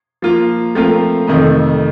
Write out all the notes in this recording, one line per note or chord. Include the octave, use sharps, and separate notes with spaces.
F3 A#3 F4
F3 A3 C4 F4 A#4
F2 C3 D#3 A3